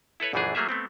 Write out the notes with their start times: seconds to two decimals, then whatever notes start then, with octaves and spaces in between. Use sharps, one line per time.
0.20 E4 A4 B4 C#5
0.33 A#1 F#2 E3 A3 D4 G#4
0.55 F#3 A3 A#3 G#4 E5
0.69 A3 B3 C4